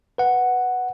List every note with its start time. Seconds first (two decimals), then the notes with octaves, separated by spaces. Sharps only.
0.18 B4 F#5